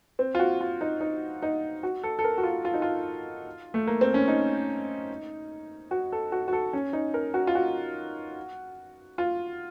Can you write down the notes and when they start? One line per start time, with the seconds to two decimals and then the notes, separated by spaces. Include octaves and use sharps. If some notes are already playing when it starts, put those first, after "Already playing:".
0.19 C4
0.35 F4
0.39 F#4
0.61 F4
0.81 D#4
1.01 D#4
1.42 D#4
1.83 F#4
2.03 A4
2.19 A4
2.24 A#4
2.38 F#4
2.43 F4
2.65 F4
2.74 D#4
2.82 F4
3.74 A3
3.87 A#3
4.01 C4
4.14 C#4
4.28 D#4
5.91 F#4
6.12 A4
6.32 F#4
6.48 F#4
6.53 A4
6.73 C#4
6.93 D#4
7.14 A#4
7.34 F#4
7.47 F4
7.55 F#4
9.18 F4